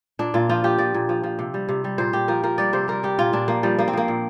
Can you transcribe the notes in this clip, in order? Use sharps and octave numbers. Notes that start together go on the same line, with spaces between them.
A#2 D4
A#2 F4
F3 F4
F3 G4
F3 D5
A#2
F3
F3
C3
G3
C3
G3
A#2 C5
A#2 G4
F3 A#4
F3 A#4
G3 D5
C3 C5
G3 A#4
G3 G4
A#2 F4
A#2 D4
F3 A#3
F3 G3
F3 A#3
C4
F3 A#3
A#2